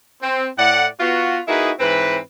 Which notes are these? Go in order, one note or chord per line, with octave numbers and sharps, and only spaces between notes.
C4
A2 D5 F#5
B3 F4 F#4
A#3 D#4 E4 F#4 G#4 B4
G#2 E3 C4 B4